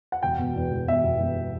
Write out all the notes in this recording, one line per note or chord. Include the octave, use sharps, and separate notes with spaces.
F#5
E1 G5
B2
E2
E1
E2 E5
E1
E1